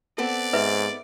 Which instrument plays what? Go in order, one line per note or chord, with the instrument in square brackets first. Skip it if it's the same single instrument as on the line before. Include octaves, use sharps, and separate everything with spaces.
[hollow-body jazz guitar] B3 C4 A4 [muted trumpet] D5
[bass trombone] G#2 [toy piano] B4 E5